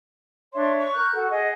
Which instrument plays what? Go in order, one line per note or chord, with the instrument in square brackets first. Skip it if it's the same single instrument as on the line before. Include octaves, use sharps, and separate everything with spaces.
[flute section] D4 C#5 E5 [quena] C6
[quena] C#6
[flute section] A#4 F#6 G6
[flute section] F#4 [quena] A4
[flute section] G#4 F#5 [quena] D#5